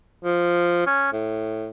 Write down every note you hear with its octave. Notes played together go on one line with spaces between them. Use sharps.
F3
C#4
A2